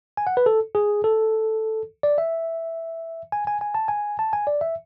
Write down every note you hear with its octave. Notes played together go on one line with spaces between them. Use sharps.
G#5
F#5
B4
A4
G#4
A4
D5
E5
G#5
G#5
G#5
A5
G#5
A5
G#5
D5
E5